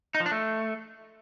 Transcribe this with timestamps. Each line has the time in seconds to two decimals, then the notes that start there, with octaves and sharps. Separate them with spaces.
0.15 D#4
0.20 F3
0.26 D4
0.31 A3